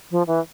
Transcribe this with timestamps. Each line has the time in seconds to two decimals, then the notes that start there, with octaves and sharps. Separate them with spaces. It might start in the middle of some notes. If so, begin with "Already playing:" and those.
0.11 F3
0.27 E3